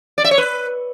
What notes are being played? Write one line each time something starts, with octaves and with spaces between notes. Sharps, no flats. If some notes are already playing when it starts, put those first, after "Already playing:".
D5
E5
C#5
B4